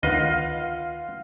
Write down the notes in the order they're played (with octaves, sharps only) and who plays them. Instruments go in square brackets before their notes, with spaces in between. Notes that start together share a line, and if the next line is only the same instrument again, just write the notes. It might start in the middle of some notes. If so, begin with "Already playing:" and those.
[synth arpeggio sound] D2 D#3 B4 [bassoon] F4 [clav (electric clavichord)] D#5 [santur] F5 F#5